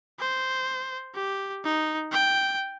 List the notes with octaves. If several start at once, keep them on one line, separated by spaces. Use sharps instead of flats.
C5
G4
D#4
G5